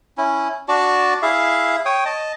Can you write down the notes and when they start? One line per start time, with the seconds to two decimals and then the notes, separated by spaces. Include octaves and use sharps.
0.18 C#4 E4
0.68 D4 F#4 D5 A5
1.22 E4 G#4 E5 F5
1.85 C#5 G5 D#6
2.05 D#5 A5